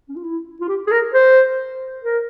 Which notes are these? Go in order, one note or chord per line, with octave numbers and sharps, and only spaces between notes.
C#4
F4
E4
F4
G4
G#4
A#4
C5
A#4